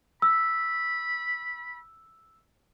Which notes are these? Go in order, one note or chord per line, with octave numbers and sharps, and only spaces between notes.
B5 E6